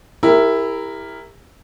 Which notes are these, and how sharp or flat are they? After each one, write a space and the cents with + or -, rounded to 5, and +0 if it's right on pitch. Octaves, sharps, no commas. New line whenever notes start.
E4 +0 G4 +35 A#4 -10